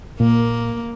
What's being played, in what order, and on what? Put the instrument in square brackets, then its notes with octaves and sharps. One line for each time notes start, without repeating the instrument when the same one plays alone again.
[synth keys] A#2 [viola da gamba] A#3